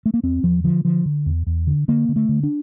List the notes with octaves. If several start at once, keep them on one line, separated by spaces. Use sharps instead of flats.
A3
A#3
E2 C4
E2 F3
D3 F3
D3 F3
D3
E2
E2
D3
D3 A#3
D3
A3
D3
D4